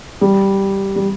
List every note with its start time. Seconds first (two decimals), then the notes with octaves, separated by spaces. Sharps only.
0.21 G3
0.96 G3